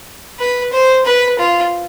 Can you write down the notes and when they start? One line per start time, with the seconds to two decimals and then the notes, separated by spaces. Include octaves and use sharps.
0.39 B4
0.72 C5
1.05 B4
1.38 F4